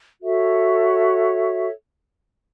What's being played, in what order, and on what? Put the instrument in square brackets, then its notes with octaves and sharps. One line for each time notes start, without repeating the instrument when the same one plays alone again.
[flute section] F#4 A4 C#5 E5